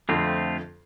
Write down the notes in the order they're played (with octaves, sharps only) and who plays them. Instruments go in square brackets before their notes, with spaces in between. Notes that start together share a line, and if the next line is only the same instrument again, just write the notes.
[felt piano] F2 D3 [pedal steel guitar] A3 C4 F4